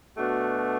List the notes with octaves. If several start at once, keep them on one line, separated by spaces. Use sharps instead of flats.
B2 A3 D4 F#4